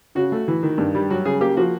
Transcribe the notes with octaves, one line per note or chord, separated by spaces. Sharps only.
C#3 F#4
A3
E3
D#3
G2
G3
F#3 F#4
C#3 G#4
A#3 G4
F3 F#4